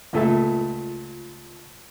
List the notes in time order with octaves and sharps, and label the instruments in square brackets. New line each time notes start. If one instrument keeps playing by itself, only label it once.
[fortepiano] C#2 A#2 A3 A4 E5 A5